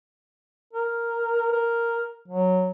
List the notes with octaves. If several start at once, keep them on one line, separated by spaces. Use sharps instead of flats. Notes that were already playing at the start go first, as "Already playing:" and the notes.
A#4
A#4
F#3